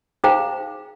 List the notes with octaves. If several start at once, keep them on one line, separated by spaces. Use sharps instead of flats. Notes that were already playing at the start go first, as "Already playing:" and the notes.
D#4 G#4 C5 F5 G5 A#5